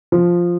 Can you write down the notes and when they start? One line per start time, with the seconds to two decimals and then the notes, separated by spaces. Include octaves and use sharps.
0.12 F3